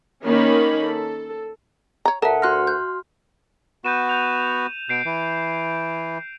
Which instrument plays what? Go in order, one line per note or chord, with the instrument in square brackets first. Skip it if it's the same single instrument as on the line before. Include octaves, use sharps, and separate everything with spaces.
[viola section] D#3 A#3 C#4 D#4 C#5 B5
A4
[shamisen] C#5 A#5
[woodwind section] D2 F#5 [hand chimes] A4 [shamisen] A#4 [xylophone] E5 A5
[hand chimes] F#4 C6 F6 [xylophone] F#6 A#6
[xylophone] F#6 G6
[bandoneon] B3 F#4 [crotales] G6 D#7 E7
[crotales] G6 F7
[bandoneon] B2 [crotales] G6 C7 D7
[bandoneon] E3